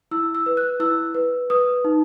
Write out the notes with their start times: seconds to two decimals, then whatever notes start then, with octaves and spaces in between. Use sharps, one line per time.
0.11 E4 E6
0.35 E6
0.46 B4
0.57 F#6
0.80 E4 E6
1.15 B4
1.50 B4 D#6
1.85 D#4